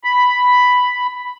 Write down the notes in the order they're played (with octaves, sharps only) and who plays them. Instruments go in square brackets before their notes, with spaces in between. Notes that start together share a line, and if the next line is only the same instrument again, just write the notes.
[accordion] B5